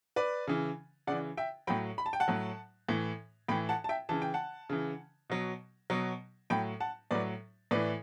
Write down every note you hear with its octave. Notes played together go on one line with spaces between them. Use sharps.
B4 D5
C#3 E3
C#3 E3 D5 F#5
E5 G5
A2 F#3 G5 B5
B5
A5
G5
F#5 A5
A2 F#3
A2 E3
A2 E3 G5 B5
F#5 A5
A5
E5 G5
C#3 E3 A5
G5
F#5 A5
C#3 E3
B2 F#3
B2 F#3
A2 F#3 G5 B5
F#5 A5
A2 F#3 B4 D5
A2 E3 B4 D5